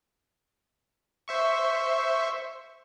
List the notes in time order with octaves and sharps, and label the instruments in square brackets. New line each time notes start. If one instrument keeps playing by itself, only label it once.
[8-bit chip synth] C5 E5 C#6